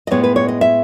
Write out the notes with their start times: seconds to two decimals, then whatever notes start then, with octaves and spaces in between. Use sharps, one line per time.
0.07 D#5
0.11 A2 G#3 B3 C#5
0.24 B4
0.36 C#5
0.48 D#5
0.61 E5